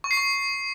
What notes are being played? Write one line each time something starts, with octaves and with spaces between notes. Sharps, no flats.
C#6
C7
C#6